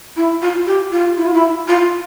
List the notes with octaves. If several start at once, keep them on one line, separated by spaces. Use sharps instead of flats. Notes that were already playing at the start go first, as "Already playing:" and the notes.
E4
F4
G4
F4
E4
F4
E4
F4